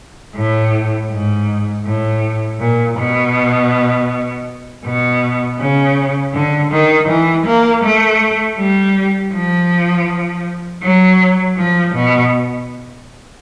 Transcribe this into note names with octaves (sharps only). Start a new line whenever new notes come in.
A2
G#2
A2
A#2
B2
B2
C#3
D3
D#3
E3
A#3
A3
G3
F3
F#3
F3
B2